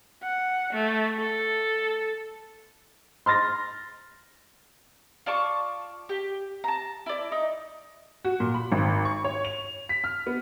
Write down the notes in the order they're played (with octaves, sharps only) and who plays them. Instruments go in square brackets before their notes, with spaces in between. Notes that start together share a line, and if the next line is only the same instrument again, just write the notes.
[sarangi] F#5
A3
A4
[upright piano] C6 F6 A6 A#6
[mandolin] F4 D5 A5 C#6
G4
A5 A#5
E4 D5
D#4
[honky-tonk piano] F#4
A#2
B5
G#1
C#6
C#5
F7
B6
F6
B3